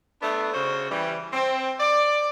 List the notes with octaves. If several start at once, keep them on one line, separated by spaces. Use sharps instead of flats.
A3 B3 D4
C#3 F#4 C5
E3 G3
C4
D5